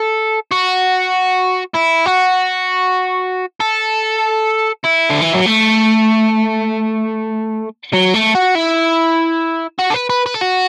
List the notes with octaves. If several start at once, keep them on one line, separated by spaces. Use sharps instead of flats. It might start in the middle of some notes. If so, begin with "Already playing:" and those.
Already playing: A4
F#4
E4
F#4
A4
E4
D3
E3
F#3
A3
F#3
A3
F#4
E4
F#4
A4
B4
B4
B4
A4
F#4